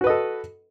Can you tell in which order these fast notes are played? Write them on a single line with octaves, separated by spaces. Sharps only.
F#4 B4 D#5 A4